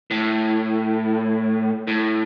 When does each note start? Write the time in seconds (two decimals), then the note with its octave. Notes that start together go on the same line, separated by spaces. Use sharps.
0.11 A2
1.87 A2